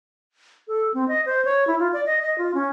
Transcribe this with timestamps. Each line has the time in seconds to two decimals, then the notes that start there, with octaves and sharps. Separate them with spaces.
0.68 A4
0.94 C4
1.08 D#5
1.26 C5
1.45 C#5
1.67 E4
1.79 F4
1.93 D5
2.06 D#5
2.22 D#5
2.38 F4
2.54 C#4